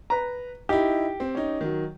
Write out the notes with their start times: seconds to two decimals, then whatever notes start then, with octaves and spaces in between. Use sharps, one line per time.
0.10 B4 A#5
0.69 D#4 E4 G4
1.20 C4
1.35 C#4 D#4
1.61 D#3 F#3